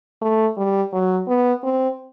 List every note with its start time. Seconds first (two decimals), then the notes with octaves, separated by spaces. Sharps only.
0.21 A3
0.57 G3
0.93 F#3
1.28 B3
1.63 C4